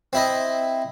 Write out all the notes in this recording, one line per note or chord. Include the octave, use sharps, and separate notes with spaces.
C4 E4 D#5